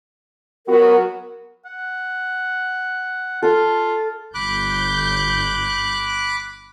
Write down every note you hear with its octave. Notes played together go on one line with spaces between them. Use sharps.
F#3 B3 F#4 A#4
F#5
F4 A4
G1 B5 D6 F#6 G6